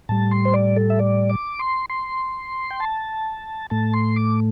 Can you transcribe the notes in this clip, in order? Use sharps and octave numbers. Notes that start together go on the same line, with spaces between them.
A2 G3 A5
C6
C5
D5
A4
E5
D5
D6
C6
C6
G5
A5
A2 A3 A5
C6
D6